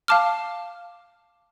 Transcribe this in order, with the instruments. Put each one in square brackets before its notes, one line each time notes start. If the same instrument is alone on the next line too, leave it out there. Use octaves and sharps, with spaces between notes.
[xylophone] F5 A5 D6 F6